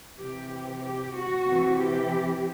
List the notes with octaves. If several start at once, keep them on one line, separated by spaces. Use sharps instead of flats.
C3 E3 G4
G4
F#4
C3 E3
G4